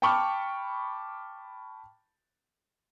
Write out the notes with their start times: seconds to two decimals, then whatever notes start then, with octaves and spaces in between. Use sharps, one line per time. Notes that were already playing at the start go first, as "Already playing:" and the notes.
0.02 G5 A5 B5 C#6 D6 F6